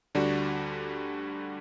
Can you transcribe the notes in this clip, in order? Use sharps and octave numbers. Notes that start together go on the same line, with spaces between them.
D2 D3 G3 D4 F#4